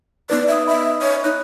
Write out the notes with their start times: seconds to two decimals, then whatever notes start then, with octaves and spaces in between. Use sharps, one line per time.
0.30 B3 D#4 B4 D5
0.48 B4 E5 D#6
0.67 D#5 E5 B5
1.02 C#5
1.24 D#4 F#6